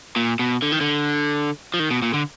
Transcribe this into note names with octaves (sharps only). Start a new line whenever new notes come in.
A#2
B2
D3
D#3
D3
F3
D#3
B2
A#2
D3